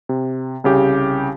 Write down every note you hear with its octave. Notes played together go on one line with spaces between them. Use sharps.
C3
C2 C#3 G4